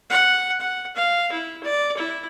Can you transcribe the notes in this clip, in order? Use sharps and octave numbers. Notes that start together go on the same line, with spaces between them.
F#5
F#5
F5
E4
D5
E4